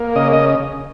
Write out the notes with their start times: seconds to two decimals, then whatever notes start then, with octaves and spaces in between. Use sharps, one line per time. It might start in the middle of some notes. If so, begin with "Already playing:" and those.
Already playing: A#3
0.15 C#3 D#5
0.33 D#5